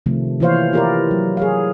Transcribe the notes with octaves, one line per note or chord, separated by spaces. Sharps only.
C3 D#3 F3 A3
E3 A#3 F4 C5 C#5 F5
E4 F4 G4 A#4 B4 D5
F#3
G#4 C#5 F5